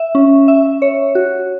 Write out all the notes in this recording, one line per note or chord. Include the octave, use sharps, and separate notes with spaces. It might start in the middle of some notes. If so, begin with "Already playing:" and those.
Already playing: E5
C#4
E5
C#5
F#4